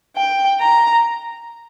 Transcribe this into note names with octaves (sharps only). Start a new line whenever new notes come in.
G5
A#5